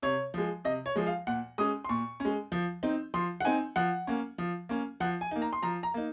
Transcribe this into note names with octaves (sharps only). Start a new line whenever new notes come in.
C3 C#5
F3 G#3
C3 D#5
C#5
F3 G#3
F5
A#2 F#5
G#3 C#4 D#6
C6
A#2 C#6
G#3 C#4
F3
C4 D#4
F3 C6
F#5
C4 D#4 G#5
F3 F#5
A#3 C#4
F3
A#3 C#4
F3 F#5
G#5
A#3 D#4
A#5
C6
F3 A#5
A#5
A#3 D#4